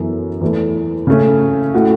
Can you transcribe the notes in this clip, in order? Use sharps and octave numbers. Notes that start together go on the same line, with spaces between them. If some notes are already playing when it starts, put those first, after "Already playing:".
Already playing: F#2 E3 B3 A4
E2 E3 A3
C#3 A3 C#4
A2 A3 F#4